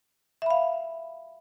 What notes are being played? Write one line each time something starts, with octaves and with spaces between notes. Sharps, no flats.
E5 F5 B5